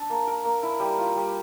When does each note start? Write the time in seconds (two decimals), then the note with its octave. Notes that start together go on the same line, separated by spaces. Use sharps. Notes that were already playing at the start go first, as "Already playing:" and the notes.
Already playing: D4 A4
0.10 A#3
0.27 A#4
0.45 A#3
0.63 E4
0.80 G3
0.98 F4
1.16 G3